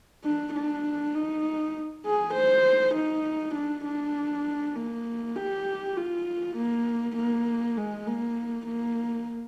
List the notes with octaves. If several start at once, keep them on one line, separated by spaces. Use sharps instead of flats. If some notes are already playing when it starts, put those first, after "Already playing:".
D4
D4
D#4
G#4
C5
D#4
D4
D4
A#3
G4
F4
A#3
A#3
G#3
A#3
A#3